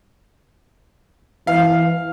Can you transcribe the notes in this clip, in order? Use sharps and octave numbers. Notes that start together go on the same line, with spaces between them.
E3 F5